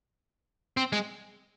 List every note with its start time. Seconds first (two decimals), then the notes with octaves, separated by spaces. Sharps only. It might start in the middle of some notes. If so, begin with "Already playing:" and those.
0.77 C4
0.93 G#3